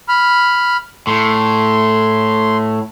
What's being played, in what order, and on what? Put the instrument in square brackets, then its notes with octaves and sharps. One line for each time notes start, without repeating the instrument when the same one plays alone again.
[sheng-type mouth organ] B5 F6
[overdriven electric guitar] A2 [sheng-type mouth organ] C6